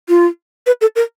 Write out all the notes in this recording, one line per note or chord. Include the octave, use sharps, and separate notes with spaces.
F4
B4
A4
A#4